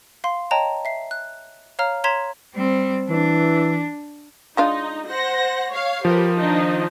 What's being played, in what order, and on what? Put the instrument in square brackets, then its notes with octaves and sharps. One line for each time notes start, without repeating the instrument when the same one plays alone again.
[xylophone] F5 C6
C#5 D#5 G5 A5 A#5
E5 C7
F#6
C#5 F5 A#5 F6
C#5 A#5 C6 G#6 B6 E7
[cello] G3 C4
[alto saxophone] E3 [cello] D4
[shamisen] G#3 D4 F4 [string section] D#4
[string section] C5 F#5 A#6
C#5 F5
[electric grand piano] F3 [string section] G4 A#4 B4
[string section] D#3 D4 D#4